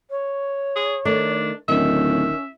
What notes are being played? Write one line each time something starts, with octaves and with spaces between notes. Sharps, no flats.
C#5
G#4
D#3 A3 D4
D1 D#3 C#4 E5